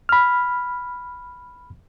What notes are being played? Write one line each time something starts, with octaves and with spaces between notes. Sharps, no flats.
B5 F6